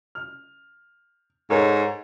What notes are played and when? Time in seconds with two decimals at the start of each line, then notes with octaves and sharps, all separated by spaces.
0.15 F6
1.50 G#2 A4 A#4 C#5